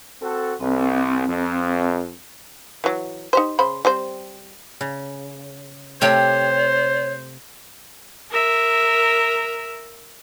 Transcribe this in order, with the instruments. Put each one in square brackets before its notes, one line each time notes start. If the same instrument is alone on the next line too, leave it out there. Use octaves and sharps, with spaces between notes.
[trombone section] C4 F#4 A4
[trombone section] C2 [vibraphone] C4
[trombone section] F2
[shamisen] E3 F#3
D#4 G4 C5
C#3 C5 B5
G3 C4 C5
[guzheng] C#3
[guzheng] C3 A3 G4 [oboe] C5 [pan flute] C#5
[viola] A#4 E5